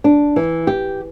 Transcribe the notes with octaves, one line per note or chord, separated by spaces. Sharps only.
D4
E3
G4